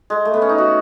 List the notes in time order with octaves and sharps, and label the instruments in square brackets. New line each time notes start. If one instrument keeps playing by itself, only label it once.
[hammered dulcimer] G#3
A3
B3
C#4
D#4
F#4